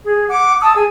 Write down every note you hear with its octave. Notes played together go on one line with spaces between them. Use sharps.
G#4
F#5 D6
A5 D#6 E6
G#4 G#5